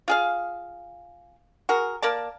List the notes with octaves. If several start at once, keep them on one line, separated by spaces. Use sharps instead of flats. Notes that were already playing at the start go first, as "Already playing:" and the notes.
F4 G#4 F5
F#4 G#4 A#4
A#3 A#4 D5 A5